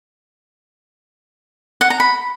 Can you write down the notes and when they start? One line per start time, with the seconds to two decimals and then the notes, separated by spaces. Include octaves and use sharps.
1.81 F#5
1.90 A#5
2.00 B5